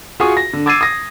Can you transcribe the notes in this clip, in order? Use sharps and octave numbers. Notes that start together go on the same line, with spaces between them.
F4 F#4 G#4 G#5 C#6 D#6
A#6
D3
D6 E6 G#6 A6 C7 D#7
D#6 A#6